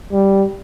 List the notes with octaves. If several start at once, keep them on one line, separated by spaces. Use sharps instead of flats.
G3